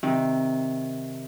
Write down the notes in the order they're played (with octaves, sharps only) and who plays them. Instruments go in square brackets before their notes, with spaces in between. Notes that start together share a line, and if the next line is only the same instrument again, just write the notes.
[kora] C3 D#3